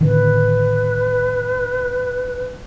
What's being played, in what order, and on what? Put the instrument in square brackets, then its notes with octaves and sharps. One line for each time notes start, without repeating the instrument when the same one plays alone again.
[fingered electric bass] A2 D3 D#3 [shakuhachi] B4